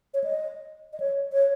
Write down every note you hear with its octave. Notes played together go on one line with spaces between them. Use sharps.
C#5
D#5
D#5
C#5
C#5